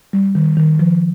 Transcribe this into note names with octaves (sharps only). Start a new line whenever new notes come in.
G3
D#3
D#3
F3